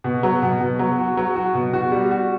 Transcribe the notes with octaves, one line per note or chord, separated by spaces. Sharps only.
B2
F#3
B2
B2
F#3
F#4
F#3
F#4
B2
F#4
G3
F#4